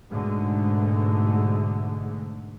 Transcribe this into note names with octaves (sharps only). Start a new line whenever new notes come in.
G#2 B2 D3 G#3 A3